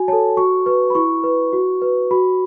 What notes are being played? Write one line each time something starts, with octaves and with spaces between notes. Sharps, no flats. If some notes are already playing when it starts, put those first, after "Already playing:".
Already playing: F#4 G#5
A4 C#5 A5
F#4 C#6
B4 C#6
B5
E4 C#6
B4
F#4
B4
F#4 B5